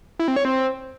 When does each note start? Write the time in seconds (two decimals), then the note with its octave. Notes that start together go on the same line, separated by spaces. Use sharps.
0.19 E4
0.28 C4
0.36 C#5
0.45 C4